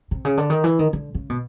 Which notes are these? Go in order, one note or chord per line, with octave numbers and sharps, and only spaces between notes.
C3
C#3
D3
D#3
E3
D#3
D3
C#3
B2